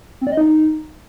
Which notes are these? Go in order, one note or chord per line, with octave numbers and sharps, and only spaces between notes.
C4
D5
D#5
D#4